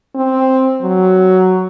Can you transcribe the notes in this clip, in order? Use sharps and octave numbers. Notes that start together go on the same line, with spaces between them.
C4
F#3